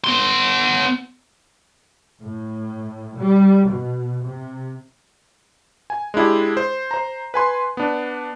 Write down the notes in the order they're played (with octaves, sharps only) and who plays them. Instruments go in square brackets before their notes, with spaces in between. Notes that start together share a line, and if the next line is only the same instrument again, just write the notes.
[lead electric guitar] B3 C6
[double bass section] A2
G3
B2
C3
[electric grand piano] G#5
G#3 D4 E4 G4
C5
C5 A#5
B4 G#5 C6
B3 D4